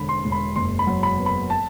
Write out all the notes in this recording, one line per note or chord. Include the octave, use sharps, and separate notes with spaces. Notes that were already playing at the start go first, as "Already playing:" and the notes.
Already playing: E1 D3 B5
C6
E1
B5
F#1 C6
B5
F#3
B5
B3
B5
A5